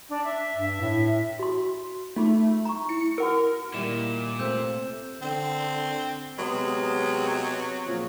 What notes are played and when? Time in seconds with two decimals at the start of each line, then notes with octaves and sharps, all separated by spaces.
0.09 D4
0.24 E5
0.56 G2
0.81 A2
1.39 F#4 C6
2.16 A3 D#4 F4 G#4
2.65 A#5 C#6
2.89 E4 C#7
3.18 F#4 A#4 F#5 E6
3.74 A#2 D#3 G3 E4 E7
4.39 C3 A3 C4 E6 G6
5.22 D3 C4
6.39 C3 F#3 G#3 B3
7.87 A#2 C#3 F3